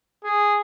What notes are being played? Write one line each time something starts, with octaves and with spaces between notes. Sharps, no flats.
G#4